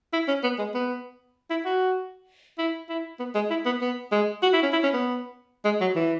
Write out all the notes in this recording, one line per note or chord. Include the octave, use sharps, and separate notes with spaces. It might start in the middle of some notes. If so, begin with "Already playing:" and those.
E4
C#4
B3
G#3
B3
E4
F#4
E4
E4
B3
G#3
E4
B3
B3
G#3
F#4
E4
C#4
E4
C#4
B3
G#3
F#3
E3